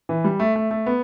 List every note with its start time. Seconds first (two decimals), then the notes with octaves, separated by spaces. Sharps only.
0.09 E3
0.24 G3
0.40 A3
0.55 A3
0.71 A3
0.86 B3